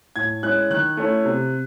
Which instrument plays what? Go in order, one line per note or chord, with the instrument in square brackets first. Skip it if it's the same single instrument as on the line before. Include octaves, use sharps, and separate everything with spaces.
[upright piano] A2 G#6
G#3 C#4 E4 F#6
D#3 F#6
A3 C#4 E4
C3